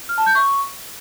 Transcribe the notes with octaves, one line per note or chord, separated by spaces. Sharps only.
F6
A5
G6
C#6